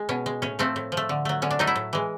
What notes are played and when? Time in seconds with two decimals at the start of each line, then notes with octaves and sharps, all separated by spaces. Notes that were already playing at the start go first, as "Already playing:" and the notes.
Already playing: G#3
0.09 B2 C#4
0.26 G#3
0.42 A2 C#4
0.59 F3 A3 C4
0.76 A2
0.92 F3
0.97 A3
1.09 D3
1.25 F#3 A3
1.42 D3 C#4
1.51 D4
1.59 F#3 A3 D#4
1.67 E4
1.76 A2
1.93 E3 G#3